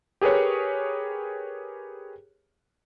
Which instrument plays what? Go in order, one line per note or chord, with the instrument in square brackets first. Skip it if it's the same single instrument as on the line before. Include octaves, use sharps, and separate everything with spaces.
[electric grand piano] G4 G#4 A#4 B4 C#5